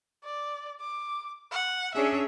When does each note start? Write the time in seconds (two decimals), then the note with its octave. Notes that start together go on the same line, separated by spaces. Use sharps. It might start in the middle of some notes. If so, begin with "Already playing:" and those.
0.24 D5
0.81 D6
1.52 F#5
1.95 C#4 D4 G#4 E5